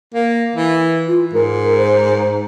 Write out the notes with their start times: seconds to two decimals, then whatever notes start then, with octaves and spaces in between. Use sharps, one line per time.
0.14 A#3
0.56 E3
1.08 F4
1.33 G#2 A#4
1.78 C5